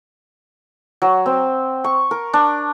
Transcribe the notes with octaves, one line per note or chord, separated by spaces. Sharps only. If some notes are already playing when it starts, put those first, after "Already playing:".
F#3
C4
C#6
A#4
D4